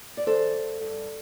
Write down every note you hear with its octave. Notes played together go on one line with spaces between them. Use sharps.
D5
E3 A4 C5
G2
G2